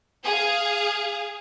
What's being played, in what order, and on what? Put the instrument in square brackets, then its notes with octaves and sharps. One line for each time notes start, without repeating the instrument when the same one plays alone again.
[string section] G#4 F5